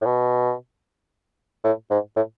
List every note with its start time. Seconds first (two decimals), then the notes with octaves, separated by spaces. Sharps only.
0.02 A2
0.06 B2
1.64 A2
1.91 G#2
2.16 A2